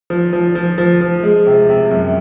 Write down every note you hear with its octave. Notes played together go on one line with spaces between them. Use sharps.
F3
F3
F3
F3
F3
G#3
C3
C3
F#2